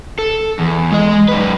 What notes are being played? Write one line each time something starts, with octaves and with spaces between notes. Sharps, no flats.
A4
E2
G#3 D#5
F#2 B4